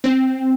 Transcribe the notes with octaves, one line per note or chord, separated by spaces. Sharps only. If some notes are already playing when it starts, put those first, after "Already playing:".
C4